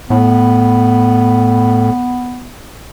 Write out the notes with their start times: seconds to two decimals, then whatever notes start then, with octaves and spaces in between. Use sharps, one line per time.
0.10 A2 B3